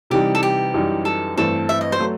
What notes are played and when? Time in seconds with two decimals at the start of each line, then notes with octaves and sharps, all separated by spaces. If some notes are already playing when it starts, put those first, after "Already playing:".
0.10 C3 E3 G3 D#4 G4
0.35 A4
0.43 G4
0.74 F#2 E3 G3 D#4
1.05 A4
1.36 G2 E3 A3 C4 A4
1.69 E5
1.81 D#5
1.92 C5
2.00 F#3 A3